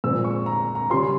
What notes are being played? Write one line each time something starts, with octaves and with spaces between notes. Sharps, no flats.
A#2 F3 G#3 C4 E6
C#6
A#5
A#5
C#3 G3 C#4 C6